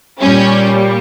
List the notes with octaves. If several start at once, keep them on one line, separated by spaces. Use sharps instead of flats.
A#2 G3 C#4